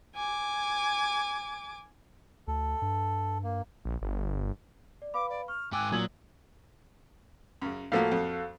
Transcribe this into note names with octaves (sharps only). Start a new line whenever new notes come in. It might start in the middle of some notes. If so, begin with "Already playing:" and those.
G#5 D6
D2 A4
G2
A#3
A#1
G1
D5
B4 F5 B5 D6
D5
C#6 F6
G#2 G5 G#5 D6 E6 F#6
A#2 F#3 D#6 E6 G#6 F#7
F#2 C#3
A2 F3 A#3 F#4 A4 F5
F2